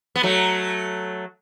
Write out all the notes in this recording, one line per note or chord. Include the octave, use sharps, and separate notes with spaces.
B3
F#3 A3